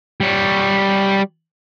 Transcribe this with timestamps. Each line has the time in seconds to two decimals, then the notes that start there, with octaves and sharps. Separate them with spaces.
0.21 G3 C#5